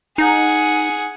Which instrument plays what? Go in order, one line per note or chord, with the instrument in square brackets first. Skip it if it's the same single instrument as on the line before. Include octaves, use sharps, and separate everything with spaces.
[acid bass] D#4 [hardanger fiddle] G#4 F#5